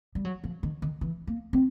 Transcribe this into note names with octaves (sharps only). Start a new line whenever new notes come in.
G3
F#3
F3
D#3
D#3
E3
A#3
C4